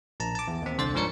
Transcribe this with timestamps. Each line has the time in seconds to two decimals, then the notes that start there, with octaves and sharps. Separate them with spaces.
0.20 A#1 A5 A#5
0.35 A5 D6
0.48 E2
0.62 D#2 C4
0.78 C2 D3 C5 C6 A6
0.94 G#2 F3 D4 A#4 C#5 C#7